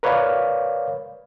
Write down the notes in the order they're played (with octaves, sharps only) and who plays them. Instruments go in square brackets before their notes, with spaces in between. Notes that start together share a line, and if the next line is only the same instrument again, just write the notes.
[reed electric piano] A#4 B4 C#5 D5 F5